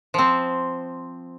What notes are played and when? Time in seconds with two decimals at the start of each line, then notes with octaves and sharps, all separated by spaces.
0.14 F3 C4